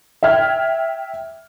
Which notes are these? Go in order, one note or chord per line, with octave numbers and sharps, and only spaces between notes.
E5 G5 F6 G#6